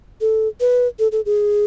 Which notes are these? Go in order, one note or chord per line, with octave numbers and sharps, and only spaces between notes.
A4
B4
A4
A4
G#4